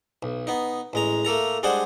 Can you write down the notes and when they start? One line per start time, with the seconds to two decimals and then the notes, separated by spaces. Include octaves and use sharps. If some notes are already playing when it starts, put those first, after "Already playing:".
0.23 B1
0.47 B3 D#4
0.93 A1 G#3 A#5
1.25 A3 A#3 A4 A#5
1.63 G3 G#3 D4 G#4 C5 F#5